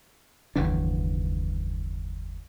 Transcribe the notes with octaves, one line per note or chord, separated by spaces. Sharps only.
F#1 D#2 E3 D4